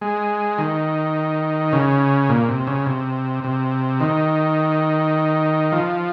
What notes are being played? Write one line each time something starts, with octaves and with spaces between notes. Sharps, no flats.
G#3
D#3
C#3
A#2
C3
C#3
C3
C3
D#3
F3